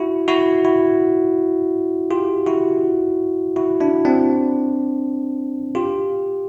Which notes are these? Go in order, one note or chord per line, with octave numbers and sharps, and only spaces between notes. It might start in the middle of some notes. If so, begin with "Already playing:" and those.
Already playing: E4 F#4
E4 F#4
E4 F#4
F4 G4
E4 F#4
E4 F#4
D4 E4
C4 D4
F4 G4